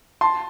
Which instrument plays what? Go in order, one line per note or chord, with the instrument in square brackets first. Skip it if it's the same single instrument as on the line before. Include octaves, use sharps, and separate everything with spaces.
[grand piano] A5 C6